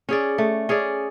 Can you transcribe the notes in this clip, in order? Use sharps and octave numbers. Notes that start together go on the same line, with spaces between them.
C#4 G#4 D5
A3
C#4 G#4 D5